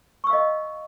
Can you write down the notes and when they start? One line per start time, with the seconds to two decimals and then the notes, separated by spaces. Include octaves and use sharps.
0.24 C#6
0.27 E6
0.30 F5
0.33 D#5